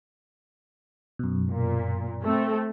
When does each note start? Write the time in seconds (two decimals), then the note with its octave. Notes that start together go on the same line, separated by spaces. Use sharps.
1.19 F#2 B2
1.50 A#2
2.22 A3 C4